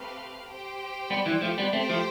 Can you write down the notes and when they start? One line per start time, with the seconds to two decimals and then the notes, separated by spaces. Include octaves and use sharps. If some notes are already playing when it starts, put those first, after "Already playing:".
Already playing: A3 C4 G4 B4 F5
0.47 G4 C5 G5
1.10 G3 B3
1.26 E3 G3
1.41 F3 A3
1.58 G3 B3
1.73 A3 C4 G4 C5 G5
1.89 F3 A3